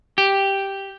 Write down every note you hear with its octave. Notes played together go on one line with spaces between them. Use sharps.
G4